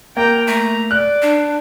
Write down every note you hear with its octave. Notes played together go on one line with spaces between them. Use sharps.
A#3 G5 A#5
A3 A#5
D5 F#6
D4